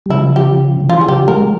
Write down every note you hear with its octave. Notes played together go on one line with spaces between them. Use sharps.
G3
C#3 F3 E4
G4
C#3
E3 F4
G#4
C#3 F3 G4
F3 G#3 A#4